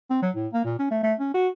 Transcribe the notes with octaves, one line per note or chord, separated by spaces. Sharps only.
C4
F#3
A2
A#3
A#2
C#4
A3
A3
C#4
F#4